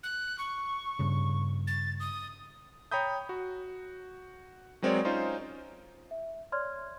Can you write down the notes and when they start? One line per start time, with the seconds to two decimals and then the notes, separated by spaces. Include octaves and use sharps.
0.03 F#6
0.39 C#6
0.99 G2 C#3
1.67 A6
2.00 D#6
2.91 C#5 G5 A#5 B5 D#6 G6
3.29 F#4
4.82 F#3 G#3 C4 A#4 C#5 D5
5.05 C#4 D#4 F4 C5
6.11 E5
6.52 C#5 D5 C6 F6 G#6